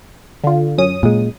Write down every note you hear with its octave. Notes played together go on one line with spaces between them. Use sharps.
D3 F4
F#2 C#4 D#6
A#2 G#3